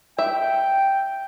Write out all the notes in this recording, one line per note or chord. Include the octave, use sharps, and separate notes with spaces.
E5 G5